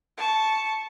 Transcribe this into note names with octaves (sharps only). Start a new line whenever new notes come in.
A5 C#6